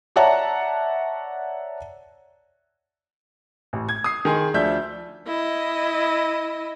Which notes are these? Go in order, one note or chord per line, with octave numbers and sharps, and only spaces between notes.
C#5 D5 E5 F#5 A5 A#5
A1
G#6
D#6 C7
D#3 G#4 G#5 C6
D2 F3 D4 E5 G6
E4 D#5